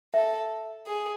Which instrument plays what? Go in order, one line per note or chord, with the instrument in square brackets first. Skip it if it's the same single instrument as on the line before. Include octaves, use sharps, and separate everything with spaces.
[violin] A4 [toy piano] E5
[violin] G#4